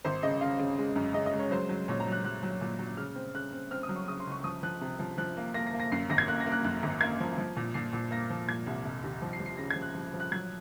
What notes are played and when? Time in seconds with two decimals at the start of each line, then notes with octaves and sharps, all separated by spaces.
0.04 G#1 C5
0.23 C#3 D#5
0.41 C#3 F5
0.59 C#3
0.78 G#3
0.96 F#2
1.14 C#3 D#5
1.26 D#5
1.33 G#3
1.39 C#5
1.51 F#3 C5
1.69 F#3
1.88 A#2 C#5
2.00 A#5
2.07 F#3
2.12 F#6
2.24 F#3 F#6
2.43 F#3
2.61 A#2
2.79 F#3
2.97 C#3 F6
3.16 C4
3.34 C#3 F#6
3.53 C4
3.71 C4 F6
3.83 D#6
3.89 F#3
3.96 C#6
4.08 C#3 D#6
4.20 C6
4.27 C#2 C#6
4.44 F3 D#6
4.63 F3 F#6
4.81 C3
4.99 F3
5.18 F3 F#6
5.37 A#3
5.54 A#3 A#6
5.67 A#6
5.74 A#3
5.80 A#6
5.92 F#2 C7
6.10 G#1 A#6
6.18 G#6
6.28 A#3 F#6
6.40 A#6
6.46 A#3
6.52 F#6
6.64 F#2 F#6
6.83 G#1
7.01 A#3 G#6
7.20 F3
7.38 F3
7.56 A#2
7.74 A#2 C7
7.93 A#2
8.11 A#3 A#6
8.30 F3
8.48 A#2 G#6
8.66 C2
8.85 F1
9.03 D#2
9.22 F3
9.33 C7
9.40 F3
9.46 C7
9.57 C#3 A#6
9.70 G#6
9.76 F3
9.82 F#6
9.95 F3
10.14 F3
10.20 F#6
10.31 F#3 G#6